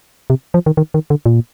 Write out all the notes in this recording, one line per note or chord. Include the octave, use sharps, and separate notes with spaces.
C3
F3
D#3
D#3
D#3
D3
A#2